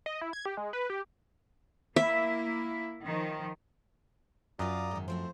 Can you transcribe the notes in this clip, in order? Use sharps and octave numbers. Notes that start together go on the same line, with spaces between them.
D#5
E4
G#6
G4
G#3
B4
G4
A#3 E4 E5
D#3 F3
F#2 F4 F#4 D5 F5 A#5 D#6
G#2 D#3
F3 A3 C4 C5